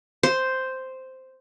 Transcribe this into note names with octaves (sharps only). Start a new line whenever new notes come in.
C5